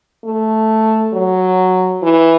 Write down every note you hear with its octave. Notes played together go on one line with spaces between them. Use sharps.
A3
F#3
E3